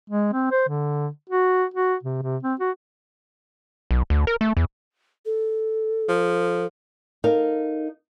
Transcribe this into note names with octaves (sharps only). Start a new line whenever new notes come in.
G#3
C4
C5
D3
F#4
F#4
C3
C3
C4
F#4
B1
D2
A#4
A3
E2
A4
F3
D#4 A4 A#4 F5